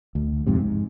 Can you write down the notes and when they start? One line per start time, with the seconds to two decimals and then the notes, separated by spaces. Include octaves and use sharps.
0.15 D2
0.47 A#1 F2 G#2 C3
0.60 G#2